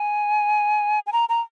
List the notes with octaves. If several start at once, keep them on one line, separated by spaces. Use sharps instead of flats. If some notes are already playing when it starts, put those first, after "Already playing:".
Already playing: G#5
G#5
A#5
A#5